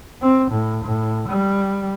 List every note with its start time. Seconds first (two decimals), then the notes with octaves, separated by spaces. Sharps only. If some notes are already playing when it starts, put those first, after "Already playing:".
0.22 C4
0.51 A2
0.84 A2
1.29 G3